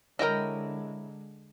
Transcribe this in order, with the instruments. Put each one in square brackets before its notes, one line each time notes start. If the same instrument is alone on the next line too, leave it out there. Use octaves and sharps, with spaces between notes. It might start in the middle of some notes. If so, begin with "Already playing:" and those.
[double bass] D3 G#3 [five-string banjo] E4 C#5 G5 [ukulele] A#4 D#5